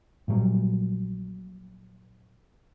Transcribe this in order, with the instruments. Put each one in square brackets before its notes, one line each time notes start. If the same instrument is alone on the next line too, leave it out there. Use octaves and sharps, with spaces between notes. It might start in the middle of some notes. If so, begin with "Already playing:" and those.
[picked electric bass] A#1 A#2 F#3 G3